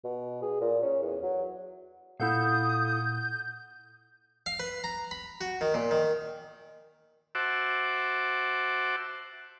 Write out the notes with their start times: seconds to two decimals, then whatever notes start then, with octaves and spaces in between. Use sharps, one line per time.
0.04 B2
0.42 G#4
0.61 A#2
0.83 C#4
1.02 E2
1.23 F#3
2.20 A#2 E4 A4 F5 F#5 D#6 G6
4.46 F5
4.60 B4
4.84 A#5
5.11 B5
5.41 F#4
5.61 D#3
5.74 A#2
5.91 D#3
7.35 F#4 C5 E5 F#5 A5 D6